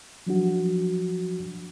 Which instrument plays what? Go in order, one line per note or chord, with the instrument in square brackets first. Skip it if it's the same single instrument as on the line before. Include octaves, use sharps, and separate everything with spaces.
[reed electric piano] F3 F#3 D4 F#4